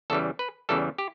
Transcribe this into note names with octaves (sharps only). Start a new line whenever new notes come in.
E2 C#3 E3 G3 A4
B4
E2 C#3 E3 G3 A4
G4